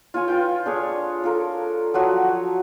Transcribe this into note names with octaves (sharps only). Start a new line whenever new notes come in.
F4 C#5 G#5
F4 B4 G5
D4 G#4 C#5
F4 A4 A#4
F3 F#3 F#4 C#5